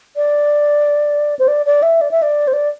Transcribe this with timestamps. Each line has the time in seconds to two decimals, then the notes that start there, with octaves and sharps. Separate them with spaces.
0.16 D5
1.39 C5
1.48 D5
1.66 D5
1.83 E5
2.01 D5
2.11 E5
2.22 D5
2.48 C5
2.53 D5